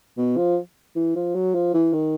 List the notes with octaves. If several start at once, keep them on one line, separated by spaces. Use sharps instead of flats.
B2
F3
E3
F3
F#3
F3
E3
D#3